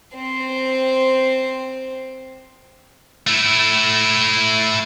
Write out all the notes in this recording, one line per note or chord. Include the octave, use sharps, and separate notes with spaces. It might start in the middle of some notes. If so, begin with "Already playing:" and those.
C4 C5
A3 E4